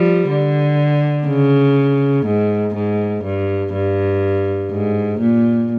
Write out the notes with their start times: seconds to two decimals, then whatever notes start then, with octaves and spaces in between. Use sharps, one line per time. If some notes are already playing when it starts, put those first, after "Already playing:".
Already playing: F3 G3
0.29 D3
1.27 C#3
2.26 G#2
2.75 G#2
3.24 G2
3.73 G2
4.71 G#2
5.20 A#2